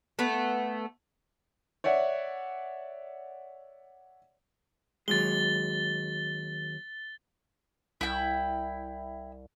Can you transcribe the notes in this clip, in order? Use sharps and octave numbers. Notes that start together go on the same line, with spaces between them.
A3 B3
C#5 D5 E5 F#5
D#2 F#3 G#3 A6 G7
C2 E4 G5